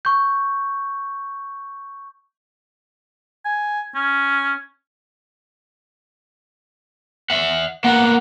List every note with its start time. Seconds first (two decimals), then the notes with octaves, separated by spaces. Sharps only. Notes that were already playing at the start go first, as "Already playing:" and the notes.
0.05 C#6 G6
3.45 G#5
3.95 C#4
7.30 E5 F#5
7.84 A#3 B3 F#5